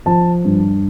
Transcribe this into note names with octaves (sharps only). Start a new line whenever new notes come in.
F3 A5
G2